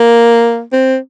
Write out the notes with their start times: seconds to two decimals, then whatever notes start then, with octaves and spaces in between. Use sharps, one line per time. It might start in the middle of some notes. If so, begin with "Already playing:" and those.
Already playing: A#3
0.73 C4